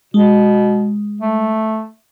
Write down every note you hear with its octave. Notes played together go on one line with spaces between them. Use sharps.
B2 G#3
A3